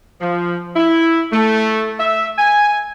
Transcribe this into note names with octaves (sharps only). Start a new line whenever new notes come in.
F3
E4
A3
E5
G#5